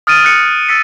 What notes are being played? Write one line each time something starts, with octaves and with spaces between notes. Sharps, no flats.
D#6 F6 A6 D7 D#7
F#6 C#7
E6 A6 B6 C#7